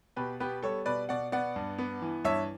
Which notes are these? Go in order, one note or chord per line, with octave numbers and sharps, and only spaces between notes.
B2 G4 B4
B3 G4 B4
G3 A4 C#5
B2 B4 D5
B2 D5 F#5
B3 D5 F#5
G2
B3
E3
G2 C#5 E5